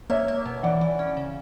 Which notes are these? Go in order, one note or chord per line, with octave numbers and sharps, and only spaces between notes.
A#3 C#5 E5
A#3
B2
E3 D5 F#5
E3
C#4
C#3